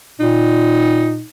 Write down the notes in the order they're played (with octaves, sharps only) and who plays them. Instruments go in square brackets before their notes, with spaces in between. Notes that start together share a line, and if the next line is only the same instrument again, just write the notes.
[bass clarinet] A#2 [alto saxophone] D#4